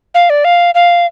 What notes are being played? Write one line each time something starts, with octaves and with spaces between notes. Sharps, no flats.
F5
D5
F5
F5